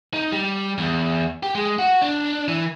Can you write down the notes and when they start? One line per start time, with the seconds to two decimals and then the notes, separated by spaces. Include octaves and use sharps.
0.14 D#4
0.32 G3
0.78 E2
1.43 G4
1.55 G#3
1.79 F#4
2.02 D4
2.48 E3